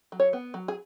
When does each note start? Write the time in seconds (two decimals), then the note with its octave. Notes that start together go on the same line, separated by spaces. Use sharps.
0.12 F#3
0.20 C#5
0.33 B3
0.54 F#3
0.68 G#4